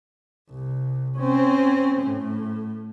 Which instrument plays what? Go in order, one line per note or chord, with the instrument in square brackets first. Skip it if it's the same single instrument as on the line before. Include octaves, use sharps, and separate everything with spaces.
[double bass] C2
C4 C#4
A2